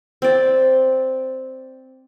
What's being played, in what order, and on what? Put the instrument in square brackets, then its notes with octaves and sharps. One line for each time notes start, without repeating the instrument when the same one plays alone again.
[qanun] C4 D5